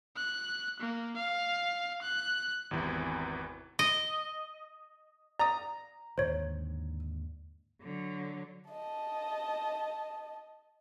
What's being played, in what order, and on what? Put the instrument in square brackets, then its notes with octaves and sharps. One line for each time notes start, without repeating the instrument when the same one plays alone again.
[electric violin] F#6
A#3
F5
F#6
[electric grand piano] G#1 E2 C3 E3
[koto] D#5
[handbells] D5 D#6 [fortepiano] A#5
[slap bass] D#2 G#2 D3 [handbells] C5 C#5
[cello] D3 F#3
[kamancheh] D#5 A5